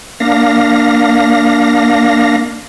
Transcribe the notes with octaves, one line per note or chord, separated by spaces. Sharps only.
A#3 D4 F5 A#6